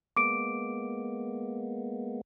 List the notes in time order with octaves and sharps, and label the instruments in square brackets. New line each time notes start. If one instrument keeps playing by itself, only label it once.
[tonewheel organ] G#3 A#3 B3 [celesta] D6 D7